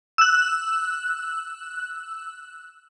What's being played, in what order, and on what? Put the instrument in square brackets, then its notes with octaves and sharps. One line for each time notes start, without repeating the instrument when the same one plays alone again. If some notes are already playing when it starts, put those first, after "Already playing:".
[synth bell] E6 F#6